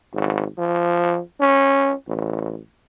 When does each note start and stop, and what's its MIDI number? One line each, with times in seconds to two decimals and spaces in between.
0.14 0.44 32
0.58 1.19 53
1.40 1.93 61
2.07 2.58 33